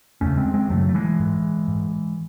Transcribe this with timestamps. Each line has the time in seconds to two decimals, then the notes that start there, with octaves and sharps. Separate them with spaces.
0.21 E2 C#3 A3 C#4
0.37 G#3 C4
0.54 G#3 C4
0.70 F#2 C#3 F#3 A3
0.89 A3
0.94 E3 G#3
1.20 G#2
1.68 G#2